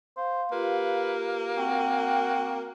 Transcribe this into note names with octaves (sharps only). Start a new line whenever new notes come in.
C5 F5
A#3 F4 G4 B4
C4 F#4 G5